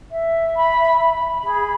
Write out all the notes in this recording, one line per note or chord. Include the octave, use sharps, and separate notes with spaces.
E5
B5
B5
G#4